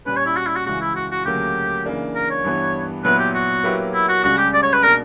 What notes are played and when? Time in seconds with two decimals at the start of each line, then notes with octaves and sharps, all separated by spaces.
0.06 A#2 G3 C#4 B4
0.17 C#5
0.26 E4
0.36 F#4
0.46 E4
0.56 F#4
0.66 C#2 C#3 E3 F#4
0.81 E4
0.95 F#4
1.11 F#4
1.25 D2 C#3 F#3 A#3 G4
1.85 C#3 E3 A#3 D4
2.15 A#4
2.30 C#5
2.44 G2 E3 B3
3.04 A#2 F#3 B3 E4 B4
3.19 G4
3.34 F#4
3.64 F#3 A#3 E4 G4 B4
3.94 E4
4.09 F#4
4.23 C#2 C#3 G3 C#4 F#4
4.38 G4
4.53 D5
4.63 C#5
4.73 B4
4.83 B2 A#3 D4 A#4